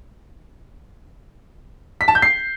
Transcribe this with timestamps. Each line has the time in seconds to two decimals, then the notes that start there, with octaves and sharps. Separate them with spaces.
2.01 B6
2.08 A5
2.15 G6
2.22 C7